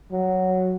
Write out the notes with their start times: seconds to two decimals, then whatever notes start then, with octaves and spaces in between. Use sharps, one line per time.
0.12 F#3